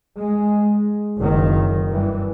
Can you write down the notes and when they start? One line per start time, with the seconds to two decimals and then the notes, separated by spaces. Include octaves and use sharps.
0.17 G#3
1.18 F#1 D#3
1.89 G2 E3